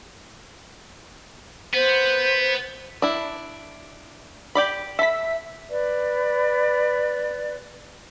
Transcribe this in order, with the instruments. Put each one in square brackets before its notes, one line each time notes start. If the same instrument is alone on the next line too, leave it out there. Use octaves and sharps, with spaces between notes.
[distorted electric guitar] B3 [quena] C5
[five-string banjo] D4 E4
G4 D5 B5
[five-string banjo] A4 B5 [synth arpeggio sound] E5 B6
[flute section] B4 D5